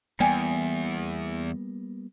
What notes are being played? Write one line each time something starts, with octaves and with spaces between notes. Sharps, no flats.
E2 G3 A#3 B3 D5 G5 G#5